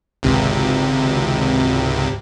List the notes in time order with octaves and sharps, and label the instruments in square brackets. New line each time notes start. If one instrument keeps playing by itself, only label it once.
[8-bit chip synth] G#1 C#2 C3